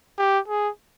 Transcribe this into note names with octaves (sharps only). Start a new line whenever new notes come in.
G4
G#4